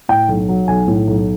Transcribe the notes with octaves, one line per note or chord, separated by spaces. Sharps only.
A2 G5
B1
F#3
B1 G#5
A2
B1